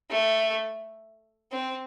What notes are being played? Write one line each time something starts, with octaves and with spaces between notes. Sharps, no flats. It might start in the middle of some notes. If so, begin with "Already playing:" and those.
A3
C4